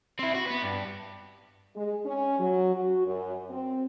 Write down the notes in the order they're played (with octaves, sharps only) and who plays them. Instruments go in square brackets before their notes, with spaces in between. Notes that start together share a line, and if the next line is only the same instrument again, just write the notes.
[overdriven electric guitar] C4 E4
F#4
B3 B4
G2
[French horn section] G#3
C#4
F#3
F#4
F#2
C4